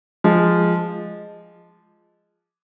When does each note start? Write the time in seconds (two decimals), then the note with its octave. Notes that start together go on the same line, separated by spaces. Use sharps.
0.24 F3 G#3